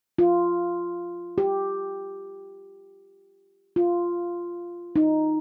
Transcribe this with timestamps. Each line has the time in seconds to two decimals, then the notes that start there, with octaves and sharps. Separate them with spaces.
0.18 F4
1.38 G4
3.76 F4
4.96 D#4